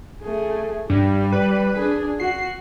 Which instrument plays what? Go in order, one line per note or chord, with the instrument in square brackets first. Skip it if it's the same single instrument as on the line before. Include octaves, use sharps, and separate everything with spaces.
[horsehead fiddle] A3 G#4
[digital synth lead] G2 [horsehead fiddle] G3
[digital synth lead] B4
[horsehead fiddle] D4 G#4
[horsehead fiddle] F#4 [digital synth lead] C7